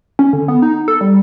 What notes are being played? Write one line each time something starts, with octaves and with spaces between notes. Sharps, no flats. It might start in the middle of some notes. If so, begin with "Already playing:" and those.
C#4
D3
B3
D#4
A4
G3